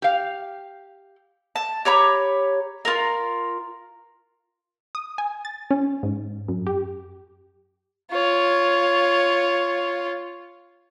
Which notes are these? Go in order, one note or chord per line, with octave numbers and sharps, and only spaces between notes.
G4 F5
A5
G4 C#5 A#5 B5
F4 A#4
D#6
G#5
A6
C#4
G#2
F#2
G4
F4 C#5